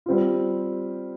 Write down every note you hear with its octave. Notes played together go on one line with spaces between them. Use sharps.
G3 C4 F4